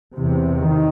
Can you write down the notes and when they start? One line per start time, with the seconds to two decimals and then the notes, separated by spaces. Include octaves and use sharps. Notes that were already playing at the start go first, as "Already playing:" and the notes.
0.15 E2 C3
0.59 D#3